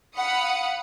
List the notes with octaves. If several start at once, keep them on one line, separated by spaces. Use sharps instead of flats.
F5 F#5 B5 D#6 C#7